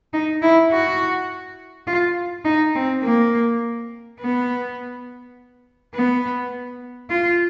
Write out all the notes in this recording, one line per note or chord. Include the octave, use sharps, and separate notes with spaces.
D#4
E4
F#4
F4
D#4
C4
A#3
B3
B3
F4